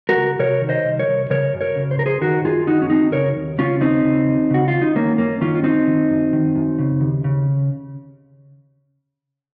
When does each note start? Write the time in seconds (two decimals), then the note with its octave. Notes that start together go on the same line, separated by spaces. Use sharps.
0.09 F#4 A#4
0.16 C#2
0.39 C3 A#4 C#5
0.61 D#3
0.69 C5 D#5
0.85 C2
0.99 A#4 C#5
1.08 C2
1.30 C#3 A#4 C#5
1.54 F#2
1.61 A#4 C#5
1.76 C#3
1.91 C5
1.99 F#2 A#4
2.06 G#4 C5
2.21 D#3 F#4 A#4
2.45 F#2 F4 G#4
2.67 D#3 D#4 F#4
2.82 C#4
2.90 F#2 C4 D#4
3.12 C#3 A#4 C#5
3.36 D#2
3.58 C#3 C#4 F4
3.81 D#2 C4 D#4
4.04 C#3
4.28 D#2
4.50 C#3 F#4
4.68 D#2 F4
4.81 D#4
4.95 D#3 A#3 C#4
5.18 F#2 A#3 C#4
5.41 D#3 C#4 F4
5.55 F4
5.64 F#2 C4 D#4
5.87 D#3
6.10 F#2
6.33 D#3
6.56 F#2
6.79 C#3
7.01 D#2
7.24 C#3